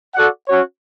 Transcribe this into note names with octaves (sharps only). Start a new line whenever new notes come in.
F#4 A4 D5 F#5
C#4 F#4 C#5